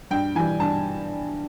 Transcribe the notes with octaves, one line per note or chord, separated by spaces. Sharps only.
G2 G5
E3 G3 G#5
G2 A5